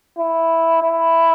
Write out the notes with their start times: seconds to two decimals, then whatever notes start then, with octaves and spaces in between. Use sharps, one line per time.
0.19 E4
0.83 E4